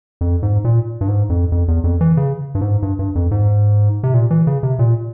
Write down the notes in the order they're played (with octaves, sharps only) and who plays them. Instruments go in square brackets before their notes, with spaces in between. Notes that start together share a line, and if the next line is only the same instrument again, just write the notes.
[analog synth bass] F2
G#2
A#2
G2
G#2
F2
F2
E2
F2
E3
C#3
G2
G#2
G2
G2
F2
G#2
C3
A#2
E3
C#3
C3
A#2